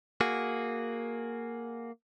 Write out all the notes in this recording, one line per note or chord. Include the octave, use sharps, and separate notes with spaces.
A#3 F#4 G#4